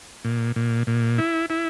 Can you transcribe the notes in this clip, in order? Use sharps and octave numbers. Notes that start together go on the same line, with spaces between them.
A#2
A#2
A#2
E4
E4